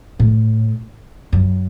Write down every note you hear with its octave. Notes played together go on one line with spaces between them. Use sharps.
A2
F#2